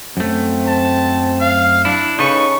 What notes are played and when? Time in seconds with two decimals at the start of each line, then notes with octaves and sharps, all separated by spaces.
0.17 F#2 A3 C4
0.67 A5
1.40 F5
1.85 D4 E4
2.19 C#3 D#4 A4 B4 C#6